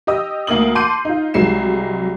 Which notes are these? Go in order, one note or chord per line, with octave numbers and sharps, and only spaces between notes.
G4 D#5 D#6 E6
D2 A#3 A#4 D#6 F#7
A5 C6 D6 G6 C7 D#7
D#4 F4
C2 F#3 G#3 C7 E7